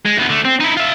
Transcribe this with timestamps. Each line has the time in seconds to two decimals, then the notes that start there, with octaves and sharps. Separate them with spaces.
0.05 G#3
0.17 D2 B3
0.29 D3 A3
0.45 C4
0.60 D#4 E4
0.77 F4 E5